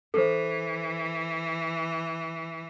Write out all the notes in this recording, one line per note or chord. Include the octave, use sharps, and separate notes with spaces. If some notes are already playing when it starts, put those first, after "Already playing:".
E3 A4 C5